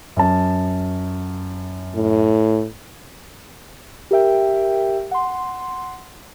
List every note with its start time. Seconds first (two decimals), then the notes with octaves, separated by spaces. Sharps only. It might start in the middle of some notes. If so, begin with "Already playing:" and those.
0.17 F#2 A5
1.95 A2
4.11 G4 A#4 E5 G5
5.11 F#5 C6